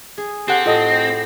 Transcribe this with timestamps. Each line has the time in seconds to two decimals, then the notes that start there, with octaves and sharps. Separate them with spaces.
0.18 G#4
0.48 C4 G4 A4 F#5
0.66 A2 F4 D#5 A5